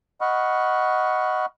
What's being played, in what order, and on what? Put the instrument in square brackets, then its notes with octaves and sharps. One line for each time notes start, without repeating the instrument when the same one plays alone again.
[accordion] D#5 F#5 B5 C#6 F6